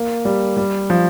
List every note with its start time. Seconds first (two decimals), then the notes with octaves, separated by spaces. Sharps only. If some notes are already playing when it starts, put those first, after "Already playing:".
Already playing: A#3
0.25 G3
0.57 G3
0.90 F3